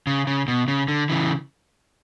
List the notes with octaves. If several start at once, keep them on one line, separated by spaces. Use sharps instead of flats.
C#3
C#3
B2
C#3
D3
C#3 E3